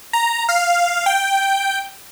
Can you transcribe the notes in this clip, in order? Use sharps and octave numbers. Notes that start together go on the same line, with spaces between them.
A#5
F5
G5